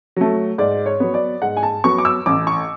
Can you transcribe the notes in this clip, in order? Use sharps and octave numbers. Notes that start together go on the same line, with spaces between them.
F#3 A3
G#2 D5
C#5
F#3 B3
D5
G#2 F#5
G#5
A5
F#3 B3 C#6
D6
E6
A1 D6
C#6